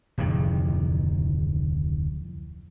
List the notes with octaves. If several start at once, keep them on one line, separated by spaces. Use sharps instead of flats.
D1 F2 C3 D#3